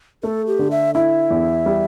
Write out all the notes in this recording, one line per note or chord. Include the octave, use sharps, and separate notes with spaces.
A3 A4
G4
D3
E5
E4 E5
E2
G3